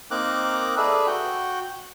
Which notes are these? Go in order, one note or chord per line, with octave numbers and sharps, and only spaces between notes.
A#3 C4 D#4 A#4 D6 F#6
G#4 A4 B4 D5 E5
F#4 G5